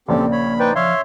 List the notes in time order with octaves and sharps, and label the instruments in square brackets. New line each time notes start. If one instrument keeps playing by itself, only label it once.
[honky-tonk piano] A#1 C#3 [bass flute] A#3 [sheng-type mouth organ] C4 G4 A4
[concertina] C#5 [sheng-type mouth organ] B5
[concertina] D#4 C5 D5 [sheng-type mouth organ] B4 G5
[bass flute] F3 [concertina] C#5 E5 C6 [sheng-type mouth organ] F5